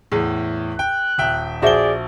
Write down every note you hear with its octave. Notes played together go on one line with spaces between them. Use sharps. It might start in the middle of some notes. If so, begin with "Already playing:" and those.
E2 A2 G#4
G5 F#6
D#1 E5 G5
A#1 F#4 G#4 C5 D5 E5 G7